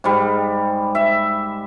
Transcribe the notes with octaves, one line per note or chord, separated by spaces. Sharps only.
G#2 G3
E5